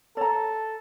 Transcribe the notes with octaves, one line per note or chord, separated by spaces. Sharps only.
A4 C#5 A#5